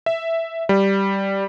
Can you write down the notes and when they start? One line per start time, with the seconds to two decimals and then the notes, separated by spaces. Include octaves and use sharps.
0.06 E5
0.69 G3